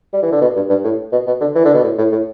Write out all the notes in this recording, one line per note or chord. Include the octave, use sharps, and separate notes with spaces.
G3
E3
D3
B2
G2
G2
A2
B2
B2
D3
E3
D3
B2
A2
A2
A2